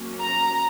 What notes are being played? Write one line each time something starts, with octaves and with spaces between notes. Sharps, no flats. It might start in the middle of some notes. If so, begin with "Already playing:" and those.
Already playing: F#3 A#3 C#4
A#5